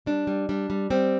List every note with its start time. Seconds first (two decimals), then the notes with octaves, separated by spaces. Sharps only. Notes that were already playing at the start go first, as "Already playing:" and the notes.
0.06 G3 D4
0.27 G3
0.49 G3 D4
0.70 G3
0.90 G3 C4